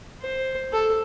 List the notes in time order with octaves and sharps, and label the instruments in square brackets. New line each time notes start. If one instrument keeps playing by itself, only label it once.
[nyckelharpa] C5
A4